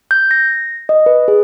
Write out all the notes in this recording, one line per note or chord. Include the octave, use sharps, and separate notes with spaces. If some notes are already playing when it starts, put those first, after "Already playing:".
G6
A#6
D#5
B4
G#4